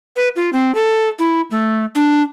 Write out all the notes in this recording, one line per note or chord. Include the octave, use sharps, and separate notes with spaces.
B4
F4
C4
A4
E4
A3
D4